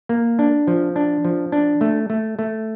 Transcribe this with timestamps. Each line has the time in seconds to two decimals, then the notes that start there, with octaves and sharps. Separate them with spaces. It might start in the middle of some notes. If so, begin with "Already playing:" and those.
0.09 A#3
0.39 D4
0.67 F3
0.96 D4
1.24 F3
1.52 D4
1.81 A3
2.10 A3
2.39 A3